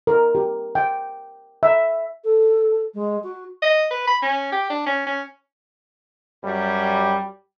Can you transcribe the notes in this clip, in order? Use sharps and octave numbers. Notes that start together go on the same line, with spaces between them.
A#4
G4
G5
E5
A4
G#3
F#4
D#5
B4
B5
C#4
G4
D4
C#4
C#4
F#2 G3